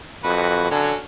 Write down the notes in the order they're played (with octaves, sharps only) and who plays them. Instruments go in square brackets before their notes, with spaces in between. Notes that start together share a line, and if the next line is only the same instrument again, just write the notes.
[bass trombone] F2 [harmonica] F#4 B4
[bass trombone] D3 [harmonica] F#3 C#4